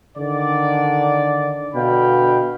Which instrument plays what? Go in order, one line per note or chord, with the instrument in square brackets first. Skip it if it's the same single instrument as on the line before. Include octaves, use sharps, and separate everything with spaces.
[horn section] D3 D#3 D5
B2 D3 F5 G5 B5